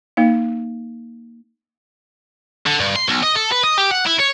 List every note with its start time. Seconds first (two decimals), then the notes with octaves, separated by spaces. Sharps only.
0.17 A#3 D#4 F5
2.66 D3
2.80 G2
2.96 C6
3.09 B1
3.24 D#5
3.36 A4
3.52 B4
3.64 D#5
3.78 G4
3.91 F#5
4.06 E4
4.19 C#5